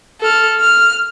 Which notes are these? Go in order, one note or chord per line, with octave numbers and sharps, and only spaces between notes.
A4 F6
F6